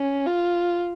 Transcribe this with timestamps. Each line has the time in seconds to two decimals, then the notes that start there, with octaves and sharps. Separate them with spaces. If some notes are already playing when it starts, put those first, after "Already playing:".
Already playing: C#4
0.27 F4